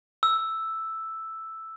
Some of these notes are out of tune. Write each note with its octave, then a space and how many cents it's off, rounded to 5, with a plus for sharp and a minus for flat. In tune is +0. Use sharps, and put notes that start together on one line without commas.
E6 +0